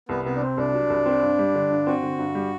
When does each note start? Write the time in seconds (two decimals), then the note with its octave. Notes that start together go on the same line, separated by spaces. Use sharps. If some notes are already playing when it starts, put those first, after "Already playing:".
0.09 C2 B3
0.24 C3 B3
0.35 D4
0.41 C3 C4
0.57 C2 D4
0.74 F#3
0.90 C2
1.06 C4
1.22 G2
1.38 G3
1.55 D3
1.71 G2
1.87 C4 F#4
2.03 D3
2.19 G2
2.35 G3